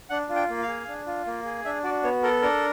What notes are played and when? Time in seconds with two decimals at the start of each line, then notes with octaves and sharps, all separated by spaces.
0.10 D4 F#5
0.29 F4
0.35 G5
0.50 A#3
0.62 F5
0.68 G#4
0.88 D4
1.06 F4
1.27 A#3
1.45 G#4
1.65 D4 E5
1.84 F#4 D5
2.04 B3 C#5
2.23 A4 A#4
2.42 D4 A#4